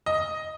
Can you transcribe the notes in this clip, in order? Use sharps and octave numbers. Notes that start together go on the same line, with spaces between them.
D#5